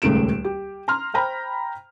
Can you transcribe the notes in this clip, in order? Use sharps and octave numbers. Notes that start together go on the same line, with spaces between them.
D#1 C#2 A3 D7 E7
G4
A#5 C6 F6
C5 G5 A#5 B5